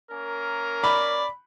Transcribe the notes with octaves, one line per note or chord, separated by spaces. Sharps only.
A#3 C#4 A#4
D5 B5